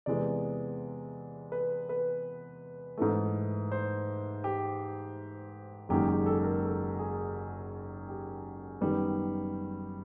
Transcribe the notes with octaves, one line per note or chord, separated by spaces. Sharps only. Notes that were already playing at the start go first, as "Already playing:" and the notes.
E2 C3 E3 G#3 B3 D5
B4
B4
G#2 E3 A3
C5
G4
F#1 F#2 D#3 G#3 G4
G4
A4
A#4
A4
G#4
G4
F#2 D#3 G3 B3